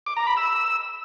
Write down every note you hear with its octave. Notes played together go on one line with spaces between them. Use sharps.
D6
A#5
B5
E6